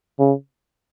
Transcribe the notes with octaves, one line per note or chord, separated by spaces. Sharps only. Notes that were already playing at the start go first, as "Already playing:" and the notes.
C#3